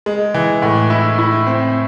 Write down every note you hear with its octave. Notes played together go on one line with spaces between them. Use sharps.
G#3
E3
A2
E4
E4
C4